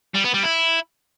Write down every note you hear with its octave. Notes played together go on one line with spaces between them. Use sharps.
G3
B3
G3
E4